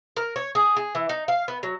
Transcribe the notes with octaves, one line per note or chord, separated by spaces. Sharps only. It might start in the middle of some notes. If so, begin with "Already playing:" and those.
A#4
C#5
G#4
G#4
E3
D#4
F5
B3
F#3